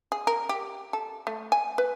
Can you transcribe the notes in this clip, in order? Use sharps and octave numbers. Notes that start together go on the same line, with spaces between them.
G#4
A#4
G4
A4
A3
G#5
B4